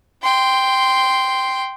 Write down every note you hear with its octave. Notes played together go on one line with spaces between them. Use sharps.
G5 C6